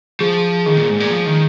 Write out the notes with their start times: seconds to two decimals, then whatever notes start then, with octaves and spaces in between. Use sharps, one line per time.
0.20 F3 G#4
0.66 D#3 G#4
0.77 A#2
0.89 G#2
1.00 A#2
1.11 F3
1.26 D#3